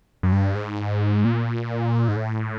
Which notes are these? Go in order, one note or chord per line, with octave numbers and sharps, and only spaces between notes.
F#2
G2
G#2
A#2
G#2
A2